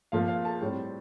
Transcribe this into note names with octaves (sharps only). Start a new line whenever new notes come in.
A#2 F3 A#3 F5
F5
A5
A2 G3 C4